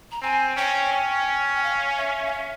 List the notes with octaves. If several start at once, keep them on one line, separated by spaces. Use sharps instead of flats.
A#5
C4 G#5
C#4 G5
C#4
G5
F5
E5
F5
E5